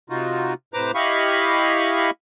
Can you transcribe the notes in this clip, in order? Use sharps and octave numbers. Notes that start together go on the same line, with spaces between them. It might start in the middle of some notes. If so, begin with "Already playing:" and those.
C3 D#4 F4 F#4
A2 C3 B4 C5 A#5 D6
E4 G4 D#5 F5 B5 C#6